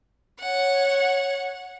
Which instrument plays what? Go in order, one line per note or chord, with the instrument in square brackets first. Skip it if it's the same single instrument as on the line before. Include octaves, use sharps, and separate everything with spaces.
[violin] C#5 F#5